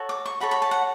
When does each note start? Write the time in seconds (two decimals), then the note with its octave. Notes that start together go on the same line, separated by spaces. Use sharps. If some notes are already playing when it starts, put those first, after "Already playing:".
Already playing: F#4 A4 C#5
0.09 D6
0.26 C#6
0.40 F#4 A4 C#5 B5
0.51 B5
0.62 A5
0.71 F#5